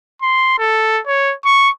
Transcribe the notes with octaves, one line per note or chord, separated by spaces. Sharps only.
C6
A4
C#5
C#6